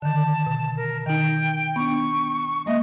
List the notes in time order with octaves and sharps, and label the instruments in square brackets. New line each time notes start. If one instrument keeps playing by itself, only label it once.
[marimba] D3 D#3 [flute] A5
[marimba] B2
[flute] A#4
[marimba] D#3 D#4 [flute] G5
[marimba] B3 D4 [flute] C#6
[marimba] G#3 A#3 E5 [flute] D#5